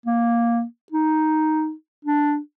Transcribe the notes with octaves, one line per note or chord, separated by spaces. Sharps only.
A#3
D#4
D4